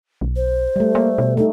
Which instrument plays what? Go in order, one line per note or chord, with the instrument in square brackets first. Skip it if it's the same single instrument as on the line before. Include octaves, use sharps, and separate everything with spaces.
[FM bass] B1
[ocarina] C5
[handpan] G3 A3
[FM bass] A#3
B2
[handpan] A3 D#4 [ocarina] A4